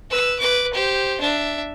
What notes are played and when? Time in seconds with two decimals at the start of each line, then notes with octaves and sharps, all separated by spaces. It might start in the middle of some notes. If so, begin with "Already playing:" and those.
0.10 B4 E6
0.40 B4 D6
0.74 G4 C5
1.21 D4 E5